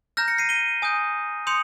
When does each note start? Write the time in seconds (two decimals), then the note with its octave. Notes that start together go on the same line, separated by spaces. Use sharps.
0.17 A#5 F6 G6 A#6
0.28 A#6 C#7
0.38 C7 D#7
0.49 D#7 G7
0.82 G#5 D#6 G6
1.47 C6 D#6 G6 C#7 F7